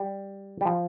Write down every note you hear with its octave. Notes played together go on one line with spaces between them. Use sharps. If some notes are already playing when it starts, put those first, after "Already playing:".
Already playing: G3
G3
F3